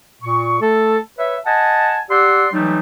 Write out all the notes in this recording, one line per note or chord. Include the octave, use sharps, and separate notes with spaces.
A#2 C#6
A3 A4
B4 C#5 E5
D#5 F#5 G#5 A5
G4 D5 F#5 C6 E6
E3 F#3 G3 A3 D#4